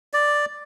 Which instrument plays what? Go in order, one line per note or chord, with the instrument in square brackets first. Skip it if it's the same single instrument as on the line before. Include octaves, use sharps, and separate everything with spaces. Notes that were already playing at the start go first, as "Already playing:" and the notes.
[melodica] D5